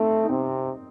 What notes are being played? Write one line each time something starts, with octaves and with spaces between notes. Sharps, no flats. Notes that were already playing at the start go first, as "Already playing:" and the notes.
Already playing: A3 C4 D#4
D#4
C3 C4